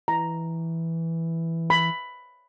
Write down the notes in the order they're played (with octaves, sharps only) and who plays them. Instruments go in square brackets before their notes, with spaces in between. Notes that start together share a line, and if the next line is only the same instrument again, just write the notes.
[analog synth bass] E3 [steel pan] A#5
[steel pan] B5